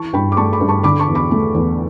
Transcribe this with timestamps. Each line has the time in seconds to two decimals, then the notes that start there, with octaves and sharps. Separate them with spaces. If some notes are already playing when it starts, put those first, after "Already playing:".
Already playing: E3 A5 C#6
0.13 G2 G5 B5
0.32 D6
0.37 A3 A5 C#6
0.53 B5 D6
0.61 G2
0.68 A5 C#6
0.83 D3 B5 D6
1.00 A5 C#6
1.08 E2
1.15 B5 D6
1.31 A3
1.54 E2